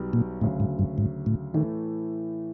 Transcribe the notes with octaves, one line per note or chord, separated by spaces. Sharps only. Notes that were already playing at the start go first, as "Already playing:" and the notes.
Already playing: B1 B2 G3
A#2
D2 A2 C#3 F#3
G#2
G2
G#2
A2
A2 D#3 E3 A3